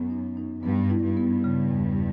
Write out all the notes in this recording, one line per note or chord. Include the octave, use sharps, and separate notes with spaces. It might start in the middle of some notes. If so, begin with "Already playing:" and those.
Already playing: F#2 B3
D#4
D#4
G2 B3
E4
G2
B3
C#3
E2